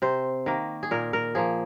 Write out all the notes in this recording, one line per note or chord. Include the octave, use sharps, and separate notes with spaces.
C3 C5
D#3 A#3
G#4
A#2 A#4
A#4
F3 A#3 G#4